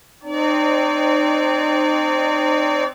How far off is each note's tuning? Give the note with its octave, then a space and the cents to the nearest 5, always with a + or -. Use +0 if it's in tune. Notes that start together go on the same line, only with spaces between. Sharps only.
C4 +0 D#4 -40 D5 -40